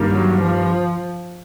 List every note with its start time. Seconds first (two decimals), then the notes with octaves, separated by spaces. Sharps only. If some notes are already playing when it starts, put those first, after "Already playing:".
Already playing: G2 D#3 G3 A#3
0.11 F#3
0.40 F3